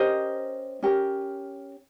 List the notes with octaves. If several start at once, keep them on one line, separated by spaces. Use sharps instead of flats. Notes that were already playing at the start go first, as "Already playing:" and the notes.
Already playing: C#4 G4 A#4 C5 D#5
C#4 G4 A#4